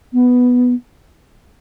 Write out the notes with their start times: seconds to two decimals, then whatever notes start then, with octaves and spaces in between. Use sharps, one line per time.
0.13 B3